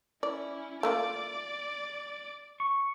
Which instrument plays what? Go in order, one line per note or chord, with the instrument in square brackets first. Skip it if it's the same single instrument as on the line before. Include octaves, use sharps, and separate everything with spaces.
[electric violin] C#4 E4 [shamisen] D5
[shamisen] A3 A#3 F4 [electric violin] D5 D6
[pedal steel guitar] C#6